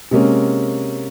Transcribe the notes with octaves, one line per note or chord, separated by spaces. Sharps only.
C3 G#3 A#3 C#4